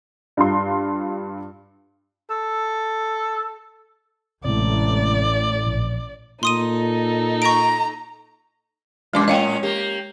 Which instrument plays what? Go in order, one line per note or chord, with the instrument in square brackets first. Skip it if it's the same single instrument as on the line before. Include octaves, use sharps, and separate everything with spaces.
[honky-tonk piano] G2 F4 C6
[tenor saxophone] A4
[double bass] A1 [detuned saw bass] A2 [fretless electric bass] C3 G#3 [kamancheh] D5
[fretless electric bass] A#1
[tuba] A#2 [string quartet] D#4 A4 [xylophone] C6 D#6 D#7
[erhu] A#5 [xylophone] C#6 D7
[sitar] F#2 A#2 [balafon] G#3 C6 D6
[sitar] A2 C#4 [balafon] D#5 F5 G5
[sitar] A#3 G4